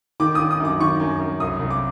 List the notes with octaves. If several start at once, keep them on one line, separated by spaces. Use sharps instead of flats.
D#3 D6
D#3 D#6
D#6
F#2 D6
D#3 C#6
F#2
F#2
C2 D#6
C2
D6